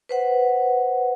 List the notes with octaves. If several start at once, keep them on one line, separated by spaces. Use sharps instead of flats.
B4 C5 F#5